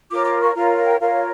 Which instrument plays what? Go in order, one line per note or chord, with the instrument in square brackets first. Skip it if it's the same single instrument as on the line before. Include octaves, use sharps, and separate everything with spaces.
[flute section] F4 A#4 C#5 D6
D6
C#6
F4 A#4 C#5 A#5
G5
F4 A#4 C#5 F5